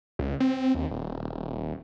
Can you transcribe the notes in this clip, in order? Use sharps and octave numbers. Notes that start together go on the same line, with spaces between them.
C#2
C4
D#2
D#1